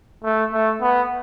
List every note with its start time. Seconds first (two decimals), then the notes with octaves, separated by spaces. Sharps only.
0.24 A3
0.53 A3
0.81 B3